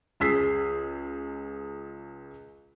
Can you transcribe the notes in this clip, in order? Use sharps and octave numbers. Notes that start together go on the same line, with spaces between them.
C#2 G#4 E6 B6 C7